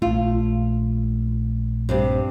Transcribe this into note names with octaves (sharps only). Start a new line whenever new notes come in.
A#1 A3 F4
G2 C3 G3